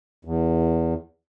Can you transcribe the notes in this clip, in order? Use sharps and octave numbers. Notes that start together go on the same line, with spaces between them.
E2